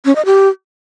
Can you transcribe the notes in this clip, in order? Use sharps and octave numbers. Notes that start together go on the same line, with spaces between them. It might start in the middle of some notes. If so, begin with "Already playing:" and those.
C#4
D#5
G4